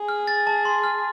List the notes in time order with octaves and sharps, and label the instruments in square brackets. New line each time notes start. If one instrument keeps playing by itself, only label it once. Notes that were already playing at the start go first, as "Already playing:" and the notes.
Already playing: [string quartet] G#4
[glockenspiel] F6
A6
A5
C6
F6